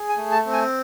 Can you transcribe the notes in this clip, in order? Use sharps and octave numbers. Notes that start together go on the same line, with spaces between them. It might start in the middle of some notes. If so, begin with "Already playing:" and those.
Already playing: G#4
G#5
A3
A5
C4
G#5